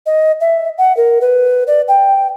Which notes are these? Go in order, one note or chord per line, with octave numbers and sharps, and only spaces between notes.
D#5
E5
F#5
A#4
B4
D5
G5